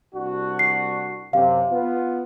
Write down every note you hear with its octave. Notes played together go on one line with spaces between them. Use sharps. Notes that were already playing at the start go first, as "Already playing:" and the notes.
C2 D4 F#4
C7
F#2 C3 F5
B3 F4